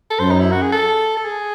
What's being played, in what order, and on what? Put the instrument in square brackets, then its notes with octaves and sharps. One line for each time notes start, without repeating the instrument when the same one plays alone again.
[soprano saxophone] A4
[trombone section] F#2 [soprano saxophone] C5
[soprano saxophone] D#4
E4
F#4
G#4
A4
A4
G#4